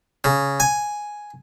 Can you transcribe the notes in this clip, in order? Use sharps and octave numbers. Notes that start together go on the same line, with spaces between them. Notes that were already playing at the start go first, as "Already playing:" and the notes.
C#3
G#5